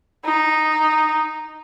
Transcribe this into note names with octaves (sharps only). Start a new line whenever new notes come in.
D#4